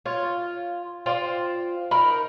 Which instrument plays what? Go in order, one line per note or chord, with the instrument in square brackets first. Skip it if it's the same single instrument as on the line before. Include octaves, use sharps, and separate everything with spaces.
[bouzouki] F4 [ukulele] C#5
[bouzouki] F4 C5 D5 [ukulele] G5
[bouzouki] D#4 A#4 [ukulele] B5